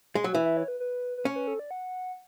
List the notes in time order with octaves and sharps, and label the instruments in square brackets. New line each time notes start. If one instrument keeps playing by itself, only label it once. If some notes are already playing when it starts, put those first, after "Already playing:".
[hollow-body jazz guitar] G#3
F#3
[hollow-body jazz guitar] E3 [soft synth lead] E5
[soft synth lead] E5
C#5
B4
B4
B4
[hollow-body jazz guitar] C#4 [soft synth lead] C#5
[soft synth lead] B4
A4
D5
F#5